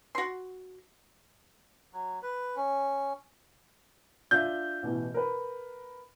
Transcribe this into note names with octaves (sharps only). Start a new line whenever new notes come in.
F#4 C6
F#3
B4
C#4
D4 F4 E5 G6
A1 B2 E3
A#4 B4